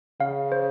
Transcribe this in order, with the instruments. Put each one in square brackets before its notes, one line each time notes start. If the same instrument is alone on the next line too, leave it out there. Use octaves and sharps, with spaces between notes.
[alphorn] C#3 [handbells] F5
[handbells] C5